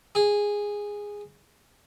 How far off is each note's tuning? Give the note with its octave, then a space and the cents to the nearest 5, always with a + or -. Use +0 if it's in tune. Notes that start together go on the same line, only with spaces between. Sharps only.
G#4 -10